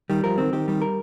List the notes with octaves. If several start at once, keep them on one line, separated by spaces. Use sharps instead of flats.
D#3 G3
F3 A#4
D#3 C4
D#3 G4
D#3 G3
A#4